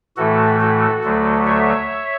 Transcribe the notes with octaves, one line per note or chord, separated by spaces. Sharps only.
A2 E3 A3 F#4 A4
F#4 A4
D2 D3 F#3 A3
C#5 E5